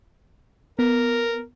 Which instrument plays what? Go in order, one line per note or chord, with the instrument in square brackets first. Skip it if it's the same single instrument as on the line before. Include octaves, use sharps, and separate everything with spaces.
[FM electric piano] B3 [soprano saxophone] A#4